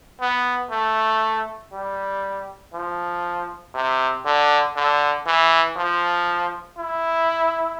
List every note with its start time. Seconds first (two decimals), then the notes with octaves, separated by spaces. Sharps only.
0.21 B3
0.71 A3
1.73 G3
2.74 F3
3.75 C3
4.25 D3
4.76 D3
5.27 E3
5.77 F3
6.78 E4